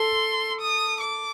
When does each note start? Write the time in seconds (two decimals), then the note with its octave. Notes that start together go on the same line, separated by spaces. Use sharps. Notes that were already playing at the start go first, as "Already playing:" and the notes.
Already playing: A4 C6
0.61 D#6
1.02 D6